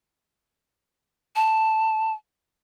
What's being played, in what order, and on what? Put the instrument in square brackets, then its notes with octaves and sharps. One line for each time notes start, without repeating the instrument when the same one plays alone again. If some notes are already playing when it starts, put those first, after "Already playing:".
[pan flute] A5